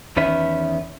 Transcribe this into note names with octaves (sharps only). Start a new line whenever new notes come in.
E2 D#3 C#4 B4 E5